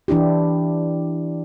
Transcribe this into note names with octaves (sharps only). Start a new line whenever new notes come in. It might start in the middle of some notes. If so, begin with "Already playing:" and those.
E3 D4 E4 G4